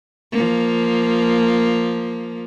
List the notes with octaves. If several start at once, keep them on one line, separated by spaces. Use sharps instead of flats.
F3 A#3